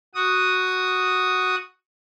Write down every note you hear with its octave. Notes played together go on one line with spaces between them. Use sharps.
F#4 D#6